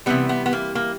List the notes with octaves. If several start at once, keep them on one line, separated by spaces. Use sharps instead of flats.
C3 E3 G3 B3
B3
B3
A#3
A#3